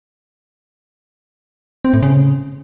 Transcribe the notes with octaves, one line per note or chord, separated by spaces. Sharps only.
C4
A2
C#3